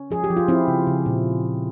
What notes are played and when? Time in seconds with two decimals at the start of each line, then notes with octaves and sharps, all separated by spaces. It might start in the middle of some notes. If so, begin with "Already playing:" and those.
Already playing: C#4
0.11 F3 G#4
0.24 G4
0.30 F3
0.37 F4
0.48 F3 C4 E4
0.68 C#3
0.87 C#3
1.06 A#2